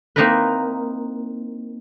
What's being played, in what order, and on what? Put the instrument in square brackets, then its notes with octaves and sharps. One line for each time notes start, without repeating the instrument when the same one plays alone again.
[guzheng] A#3 C4 D#4 E4 A#4 B4